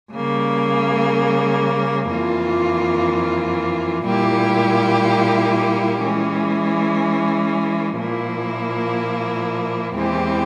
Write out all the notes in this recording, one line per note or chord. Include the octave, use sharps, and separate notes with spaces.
C#3 G3 A#3
F2 E3 A#3 F4
A#2 G3 A#3 E4 G4
E3 G#3 C#4
A#2 F3 A#3 E4
E2 E3 G#3 C4 G4